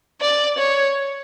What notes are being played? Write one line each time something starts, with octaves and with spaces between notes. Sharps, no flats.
D5
C#5